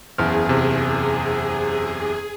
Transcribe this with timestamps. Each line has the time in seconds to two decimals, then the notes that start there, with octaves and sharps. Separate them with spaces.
0.18 F#1 E2 G#4 F6
0.49 C3